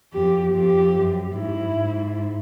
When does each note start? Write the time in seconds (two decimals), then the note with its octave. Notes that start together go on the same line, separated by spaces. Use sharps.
0.13 F2 G4
0.54 F2 G4
0.95 F#2
1.34 G#2 E4
1.74 G#2